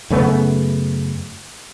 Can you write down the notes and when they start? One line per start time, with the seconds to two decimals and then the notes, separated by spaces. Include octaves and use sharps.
0.10 F#2 C#3 A3 B3